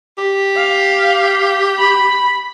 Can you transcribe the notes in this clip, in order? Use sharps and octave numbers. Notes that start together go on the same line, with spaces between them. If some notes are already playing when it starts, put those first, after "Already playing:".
G4
F5
B5